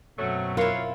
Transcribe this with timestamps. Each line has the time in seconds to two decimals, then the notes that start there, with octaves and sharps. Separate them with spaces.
0.17 F#2 B2 F#3 A3 C4
0.57 E4 F4 A#4 B4 C#5 F5